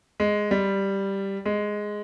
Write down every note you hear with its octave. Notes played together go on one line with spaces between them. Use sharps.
G#3
G3
G#3